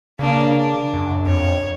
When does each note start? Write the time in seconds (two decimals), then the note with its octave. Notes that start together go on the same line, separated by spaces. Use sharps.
0.19 C#3 A#3 D4
0.57 D4
0.94 F#2
1.26 F2 C#5